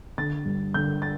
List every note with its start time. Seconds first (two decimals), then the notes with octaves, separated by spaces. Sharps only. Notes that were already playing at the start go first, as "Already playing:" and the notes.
0.18 D3 A6
0.45 G2
0.74 D3 G6
1.02 A6